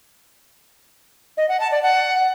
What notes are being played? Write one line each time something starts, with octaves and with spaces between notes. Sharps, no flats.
D#5
F#5
A5
D5
F#5